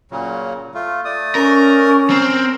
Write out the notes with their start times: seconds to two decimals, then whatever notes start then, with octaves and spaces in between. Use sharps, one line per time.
0.11 A#2 C#3 F#3
0.74 A3 F4
1.05 A3 D5 D#6
1.35 C#4 A#4
2.10 C4 A#4